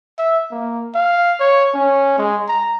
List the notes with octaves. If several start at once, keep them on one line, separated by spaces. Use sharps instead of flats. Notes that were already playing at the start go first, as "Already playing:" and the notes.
E5
A#3
F5
C#5
C#4
G#3
A#5